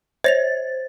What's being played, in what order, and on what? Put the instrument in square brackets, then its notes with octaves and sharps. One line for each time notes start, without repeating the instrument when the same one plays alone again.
[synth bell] C5 A6 [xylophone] C#5 A#6 F7